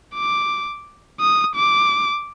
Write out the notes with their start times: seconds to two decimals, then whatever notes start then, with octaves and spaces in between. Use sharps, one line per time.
0.14 D6
1.20 D#6
1.55 D6